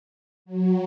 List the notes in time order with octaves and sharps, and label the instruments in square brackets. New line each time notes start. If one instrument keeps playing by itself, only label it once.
[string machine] F#3